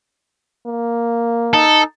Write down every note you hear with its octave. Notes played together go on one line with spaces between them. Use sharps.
A#3
D#4 A4